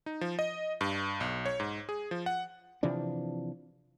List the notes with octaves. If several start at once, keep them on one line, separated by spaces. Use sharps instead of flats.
D#4
F3
D#5
G2
B1
C#5
G#2
G#4
F3
F#5
C3 E3 F3 D4